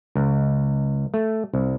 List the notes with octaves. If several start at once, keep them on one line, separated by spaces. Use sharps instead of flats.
C#2
A3
C2